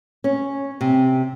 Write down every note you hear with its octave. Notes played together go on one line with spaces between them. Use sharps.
C#4
C3